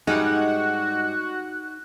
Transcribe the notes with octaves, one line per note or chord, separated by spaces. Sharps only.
G#2 G3 G#3 D#4 F#4 F#6